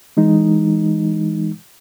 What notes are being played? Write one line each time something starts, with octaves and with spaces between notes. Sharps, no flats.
E3 G#3 D#4